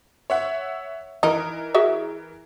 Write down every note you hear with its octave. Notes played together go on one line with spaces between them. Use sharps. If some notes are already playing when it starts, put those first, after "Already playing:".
C#5 E5 F#5
E3 D#4 A#4
F#4 G#4 E5